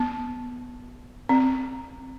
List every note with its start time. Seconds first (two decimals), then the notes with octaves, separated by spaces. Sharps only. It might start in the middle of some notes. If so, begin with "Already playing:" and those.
Already playing: B3
1.29 C4